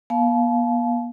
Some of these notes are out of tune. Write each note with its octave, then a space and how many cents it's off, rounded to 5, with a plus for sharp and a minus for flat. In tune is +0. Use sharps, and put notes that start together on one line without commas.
B3 -45 F5 +0 A5 -35